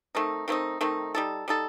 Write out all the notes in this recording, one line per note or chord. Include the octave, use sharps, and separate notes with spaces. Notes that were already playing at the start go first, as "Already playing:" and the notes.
D#3 A3 C4 D#4
D#3 A3 C4 D#4
D#3 A3 C4 D#4
G3 D#4 A4
G3 D#4 A4